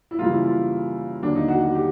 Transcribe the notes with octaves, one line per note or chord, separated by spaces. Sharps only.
E4
F#2 C#3 E3 G3 A#3 F4
E4
F4
D#2 D3 F#3 A#3 D4
D#4
F#4
F#4
G4